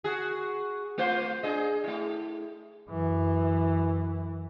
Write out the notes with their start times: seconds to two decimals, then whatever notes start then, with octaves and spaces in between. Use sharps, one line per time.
0.04 F#4 G#4
0.98 A3 F4 C5
1.43 D4 G#4 D#5
1.84 A3 E4
2.89 F#2 E3